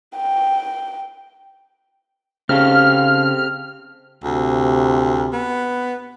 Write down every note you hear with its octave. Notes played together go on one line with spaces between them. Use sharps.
G5
C#3 C4 G4 A4 F5 F6
D2 C3
B3